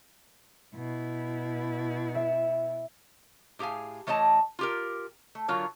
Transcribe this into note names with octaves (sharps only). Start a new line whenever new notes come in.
B2 E4
E5
A2 G4 G#4 F5 G#5
E3 A3 C#5 D#5 A5
F4 G4 A#4
A3
D3 F#3 F4 A#4 C#5